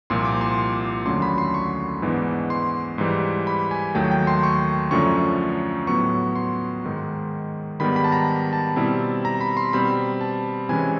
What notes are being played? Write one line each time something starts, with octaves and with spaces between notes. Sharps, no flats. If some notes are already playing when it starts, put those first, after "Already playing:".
C2 A#2 F3 A#3 C6
D6
C6
D#2 D3 F#3 A3 C#4 C6
B5
C6
C#6
G#2 E3 G#3 B3 D4
C6
G#2 E3 G3
B5
G#5
D#2 D#3 F#3 A3 G5
G5
C6
C#6
F#2 D3 F3 A3 C#4 C#6
A2 F#3 B3 C#6
C6
G#2 D#3 G#3
G#2 D#3 G3 B3 B5
B5
A5
A#5
A5
B2 G3 C4 E4
A#5
B5
C6
B2 G3 C4 B5
A5
C3 E3 G#3 C#4 E4 G#5